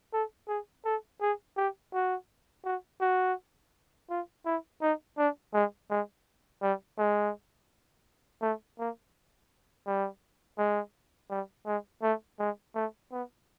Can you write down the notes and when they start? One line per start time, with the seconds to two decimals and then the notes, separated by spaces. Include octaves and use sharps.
0.13 A4
0.48 G#4
0.85 A4
1.21 G#4
1.57 G4
1.94 F#4
2.65 F#4
3.01 F#4
4.10 F4
4.46 E4
4.82 D#4
5.18 D4
5.54 G#3
5.90 G#3
6.62 G3
6.98 G#3
8.42 A3
8.79 A#3
9.86 G3
10.58 G#3
11.30 G3
11.66 G#3
12.03 A3
12.39 G#3
12.75 A3
13.11 B3